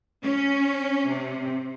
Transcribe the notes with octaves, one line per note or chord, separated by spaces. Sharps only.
C#4
C3